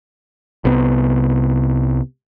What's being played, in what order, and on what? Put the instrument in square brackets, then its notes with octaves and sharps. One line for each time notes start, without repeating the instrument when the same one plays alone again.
[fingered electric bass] C2 C3 B3